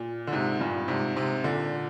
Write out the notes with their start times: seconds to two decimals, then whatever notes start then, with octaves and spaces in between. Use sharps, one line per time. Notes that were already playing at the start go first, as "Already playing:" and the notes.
Already playing: A#2
0.27 D3
0.32 G#2 C3
0.60 G2 A#2
0.88 G#2 C3
1.16 G#2 C3
1.44 A#2 D3